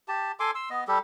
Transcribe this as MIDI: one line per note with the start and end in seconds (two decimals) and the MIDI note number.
0.08 0.32 67
0.08 0.32 81
0.40 0.51 69
0.40 0.51 80
0.40 0.51 84
0.40 0.51 86
0.55 0.69 84
0.55 0.69 88
0.70 0.84 59
0.70 0.84 75
0.88 0.99 55
0.88 0.99 67
0.88 0.99 69